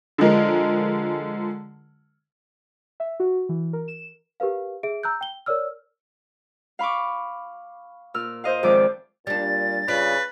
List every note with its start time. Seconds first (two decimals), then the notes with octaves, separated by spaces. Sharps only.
0.18 D3 F3 G#3 A#4
3.00 E5
3.20 F#4
3.49 E3
3.73 A#4
3.88 E7
4.40 G4 A#4 B4 F5
4.83 G#4 E5 D7
5.03 A#5 E6 F#6 G6
5.21 G5 G7
5.46 A#4 C#5 D5 E6 F6
6.79 F5 B5 C#6 D6
8.14 A#2 E6 F6
8.44 C5 D#5 F5
8.63 F2 G#2 D#3 D5 E5 D6
9.27 A#2 G3 D4 A6
9.88 C#3 F4 B4 D5